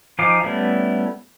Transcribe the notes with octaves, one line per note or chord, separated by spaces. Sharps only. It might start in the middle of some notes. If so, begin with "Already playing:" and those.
F3 D#4 F5 G#5 D6
G3 A3 B3 C#4 E4